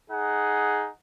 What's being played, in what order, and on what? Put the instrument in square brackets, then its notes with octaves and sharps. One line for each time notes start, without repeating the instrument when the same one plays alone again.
[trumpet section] D#4 G#4 F#5